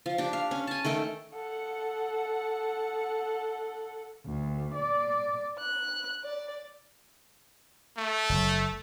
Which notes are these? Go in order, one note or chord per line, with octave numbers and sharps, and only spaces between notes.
F3
D4 G4
F5
C#4
G#5 A5
D#3 A3 A4 G5
A4 F#5
D2
D5
F#6
D5
A3
F#1